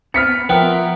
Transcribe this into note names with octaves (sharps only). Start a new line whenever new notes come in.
B3 C4 B4 F6 B6 C#7
F3 B3 A#4 E5 G5